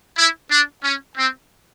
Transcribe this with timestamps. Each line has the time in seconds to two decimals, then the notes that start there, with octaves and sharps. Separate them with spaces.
0.17 E4
0.51 D4
0.83 C#4
1.17 C4